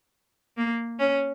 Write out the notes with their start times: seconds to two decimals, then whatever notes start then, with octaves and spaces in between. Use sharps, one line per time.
0.57 A#3
0.99 C#4